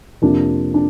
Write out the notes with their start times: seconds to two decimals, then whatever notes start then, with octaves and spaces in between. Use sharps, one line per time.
0.22 F2 C3 F3 A#3 D4
0.74 D4